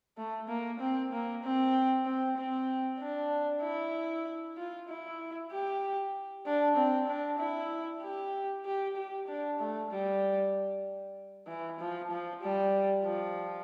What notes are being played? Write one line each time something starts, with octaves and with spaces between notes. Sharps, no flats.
A3
A#3
C4
A#3
C4
C4
C4
D4
E4
F4
E4
G4
D4
C4
D4
E4
G4
G4
G4
D4
A3
G3
E3
F3
F3
G3
F3